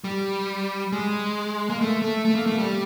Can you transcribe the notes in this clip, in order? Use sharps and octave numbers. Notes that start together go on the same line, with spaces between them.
G3
G#3
A#3
A3
A3
A3
A#3
A3
G3